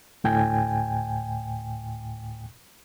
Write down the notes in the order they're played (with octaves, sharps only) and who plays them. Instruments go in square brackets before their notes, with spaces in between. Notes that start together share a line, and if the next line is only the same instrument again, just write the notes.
[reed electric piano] D2 A2 G5 G#5